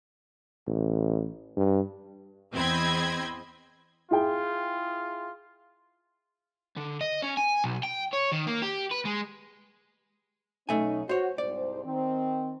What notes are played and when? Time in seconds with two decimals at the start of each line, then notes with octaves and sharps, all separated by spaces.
0.67 A1
1.56 G2
2.53 E2 C4 D#5 B5 G#6
4.11 E4 F4 G#4 G5
6.77 D3
7.01 D#5
7.22 C#4
7.37 G#5
7.64 B1
7.83 G5
8.13 C#5
8.32 D#3
8.47 A#3
8.62 G4
8.91 B4
9.05 G#3
10.69 B1 A3 C#4 D#4 G#5
11.09 F#4 C5 C#5
11.38 C2 G#2 C5 D5
11.85 D#3 C4